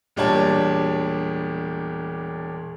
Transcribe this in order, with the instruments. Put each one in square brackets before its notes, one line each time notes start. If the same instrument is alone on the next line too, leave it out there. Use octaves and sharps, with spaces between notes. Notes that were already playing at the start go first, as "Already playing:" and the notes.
[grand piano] E1 A#2 G3 D4 C#5 A5